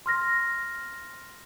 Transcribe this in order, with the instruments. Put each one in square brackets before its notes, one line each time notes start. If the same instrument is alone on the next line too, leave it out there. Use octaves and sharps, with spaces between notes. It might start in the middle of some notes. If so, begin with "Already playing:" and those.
[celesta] C6 F6 A#6